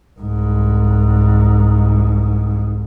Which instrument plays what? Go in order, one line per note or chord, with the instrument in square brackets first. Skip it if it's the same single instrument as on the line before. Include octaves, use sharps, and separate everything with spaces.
[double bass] C2 G#2